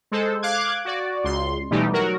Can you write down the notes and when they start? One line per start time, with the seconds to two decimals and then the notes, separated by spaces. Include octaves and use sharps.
0.11 G#3 A4 C5
0.42 F5 D6 F#6 G#6
0.85 F#4 D5
1.24 C#2 C6
1.70 B2 E3 G3 A3 D#4 G4
1.92 F#3 F#4 A#4